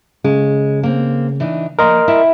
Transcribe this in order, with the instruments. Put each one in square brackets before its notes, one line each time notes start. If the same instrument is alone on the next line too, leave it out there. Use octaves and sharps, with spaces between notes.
[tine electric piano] C#3 [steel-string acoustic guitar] G#3
[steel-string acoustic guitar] A#3 C4
E3 D4 D#4
[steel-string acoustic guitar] F3 A#3 D5 [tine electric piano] A#4 D#5 C6
[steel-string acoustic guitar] E4 E5 G5